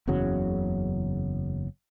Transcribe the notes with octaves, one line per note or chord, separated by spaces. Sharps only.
F#1 E2 C#3 F#3